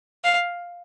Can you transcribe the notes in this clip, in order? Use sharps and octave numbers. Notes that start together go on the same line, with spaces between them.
F5